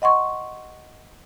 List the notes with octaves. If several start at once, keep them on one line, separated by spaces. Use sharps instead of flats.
D#5 F#5 C6 C#6